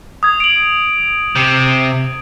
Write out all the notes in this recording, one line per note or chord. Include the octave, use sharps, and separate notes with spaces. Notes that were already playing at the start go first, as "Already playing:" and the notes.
D#6 G#6
D7 F#7
C3